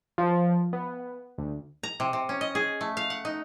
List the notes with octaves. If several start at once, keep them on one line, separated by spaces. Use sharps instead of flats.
F3
B3
D2
A#5
C3
C3
C#4
D#5
G#4
A3
F5
F#5
D#4